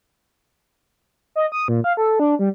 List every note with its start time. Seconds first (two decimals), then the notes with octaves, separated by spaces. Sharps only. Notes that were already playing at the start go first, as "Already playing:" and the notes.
1.36 D#5
1.52 D#6
1.68 A#2
1.84 F5
1.97 A4
2.20 D4
2.39 G3